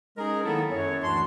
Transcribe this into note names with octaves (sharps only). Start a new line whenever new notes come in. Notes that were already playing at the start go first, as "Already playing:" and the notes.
G#3 C#4 D#4 G#4 A#4
D#3 F#3 A#3 B3 E4 A4
F#2 C#5
D2 E3 D4 F#4 A5 C6